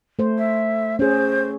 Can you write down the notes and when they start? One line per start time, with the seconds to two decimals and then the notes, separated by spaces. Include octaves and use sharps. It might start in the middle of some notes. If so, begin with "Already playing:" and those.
0.19 A3 C5
0.38 E5
0.99 C#4 G#4 C5